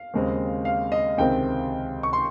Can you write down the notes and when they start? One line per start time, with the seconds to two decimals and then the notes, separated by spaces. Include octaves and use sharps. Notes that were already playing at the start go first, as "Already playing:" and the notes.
Already playing: F5
0.14 D#2 C#3 G#3 C4
0.65 F5
0.92 D#5
1.18 C#2 C3 D#3 G#3 C4 G5
2.03 C#6
2.13 C6